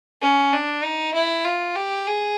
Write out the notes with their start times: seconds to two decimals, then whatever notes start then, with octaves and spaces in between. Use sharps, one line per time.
0.22 C#4
0.53 D4
0.83 D#4
1.14 E4
1.45 F4
1.76 G4
2.07 G#4